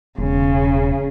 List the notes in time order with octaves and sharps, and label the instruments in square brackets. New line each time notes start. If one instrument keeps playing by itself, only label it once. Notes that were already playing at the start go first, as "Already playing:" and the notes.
[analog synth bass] E1 [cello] C#3